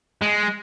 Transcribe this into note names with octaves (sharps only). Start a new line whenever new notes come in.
G#3